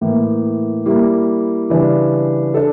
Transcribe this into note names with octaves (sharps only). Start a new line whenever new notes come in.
A2 E3 A#3
G3 A#3 E4
C#3 E3 G3 D4
D4 A4